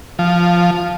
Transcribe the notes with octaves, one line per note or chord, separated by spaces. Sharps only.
F3